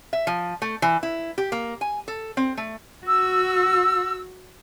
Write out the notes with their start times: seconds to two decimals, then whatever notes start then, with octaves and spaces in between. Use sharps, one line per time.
0.13 E5
0.27 F3
0.62 A3
0.82 E3
1.03 E4
1.38 G4
1.52 A#3
1.81 G#5
2.08 A4
2.37 C4
2.57 A3
3.07 F#4 E6